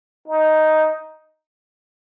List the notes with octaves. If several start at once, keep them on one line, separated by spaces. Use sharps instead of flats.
D#4